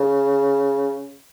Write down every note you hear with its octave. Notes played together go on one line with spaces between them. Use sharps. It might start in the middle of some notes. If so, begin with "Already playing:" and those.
Already playing: C#3